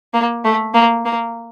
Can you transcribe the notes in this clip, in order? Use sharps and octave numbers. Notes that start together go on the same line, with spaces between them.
A#3
A3
A#3
A#3